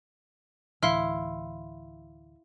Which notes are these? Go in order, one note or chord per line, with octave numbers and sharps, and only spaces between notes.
D2 A2 E3 E4 F5 C6 F6